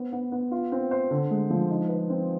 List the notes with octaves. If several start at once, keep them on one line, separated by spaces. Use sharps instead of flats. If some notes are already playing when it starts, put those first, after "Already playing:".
Already playing: B3 C5
B3
B3
F4
C4
C5
D3
G#3
F3
D#4
B4
C4